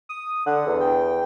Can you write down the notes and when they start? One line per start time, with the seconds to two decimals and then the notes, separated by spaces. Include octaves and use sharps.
0.09 D#6
0.47 D3 F#5
0.67 E2
0.81 G5